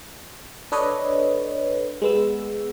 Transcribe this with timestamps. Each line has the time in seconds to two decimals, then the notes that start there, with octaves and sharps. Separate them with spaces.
0.72 D4 A4 B4 C#5 D#5
2.02 G#3 B3 E6